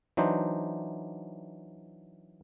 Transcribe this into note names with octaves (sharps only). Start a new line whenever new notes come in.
E3 F#3 D4 D#4 C5